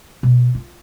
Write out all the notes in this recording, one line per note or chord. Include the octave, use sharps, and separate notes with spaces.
B2
F4